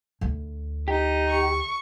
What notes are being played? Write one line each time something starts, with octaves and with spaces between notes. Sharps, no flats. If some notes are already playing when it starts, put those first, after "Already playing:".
D2
D#4 G4
C#6